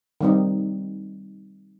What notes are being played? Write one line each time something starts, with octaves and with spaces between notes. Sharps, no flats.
D#3 G3 C4 D#4